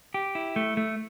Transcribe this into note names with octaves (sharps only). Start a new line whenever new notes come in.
G4
E4
A3
A3